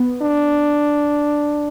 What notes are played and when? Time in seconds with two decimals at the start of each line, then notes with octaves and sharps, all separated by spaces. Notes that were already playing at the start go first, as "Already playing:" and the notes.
Already playing: B3
0.22 D4